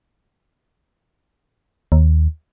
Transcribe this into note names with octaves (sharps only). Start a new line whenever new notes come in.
D#2